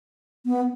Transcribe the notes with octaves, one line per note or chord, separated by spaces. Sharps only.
B3